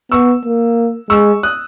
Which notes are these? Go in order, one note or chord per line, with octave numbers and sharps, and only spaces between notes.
B3 C#6 E6
A#3
G#3 C#6 E6
D#6 F#6